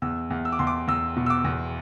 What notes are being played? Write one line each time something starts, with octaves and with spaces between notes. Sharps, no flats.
E2 E6
E2
E6
D6
E2 C6
D6
E2 E6
B2
E6
D6
E2